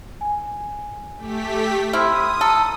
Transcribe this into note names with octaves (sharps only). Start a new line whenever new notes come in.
G#5
A3 G4 B6
C4 E4 C6 D#6 F6
A4 A#5